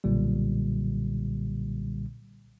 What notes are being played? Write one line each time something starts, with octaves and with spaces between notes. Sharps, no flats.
B1 A#2 D3 G3